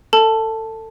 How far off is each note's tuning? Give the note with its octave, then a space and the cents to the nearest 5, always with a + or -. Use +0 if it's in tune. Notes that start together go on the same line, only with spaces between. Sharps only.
A4 +25 A5 +0